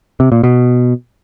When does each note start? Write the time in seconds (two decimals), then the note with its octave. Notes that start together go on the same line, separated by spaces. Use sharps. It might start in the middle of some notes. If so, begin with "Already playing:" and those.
0.20 C3
0.32 A#2
0.43 B2